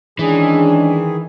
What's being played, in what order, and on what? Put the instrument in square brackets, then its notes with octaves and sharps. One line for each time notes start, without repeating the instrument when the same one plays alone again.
[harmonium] D#3 G#4 [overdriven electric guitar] E3 [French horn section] G#3 C#4 D4